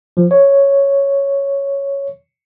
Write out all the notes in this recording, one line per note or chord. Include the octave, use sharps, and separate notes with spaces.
F3
C#5